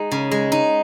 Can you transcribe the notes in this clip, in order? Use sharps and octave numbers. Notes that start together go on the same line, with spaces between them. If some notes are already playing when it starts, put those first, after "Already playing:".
Already playing: G#3 D#4
C#3
G#3
D#4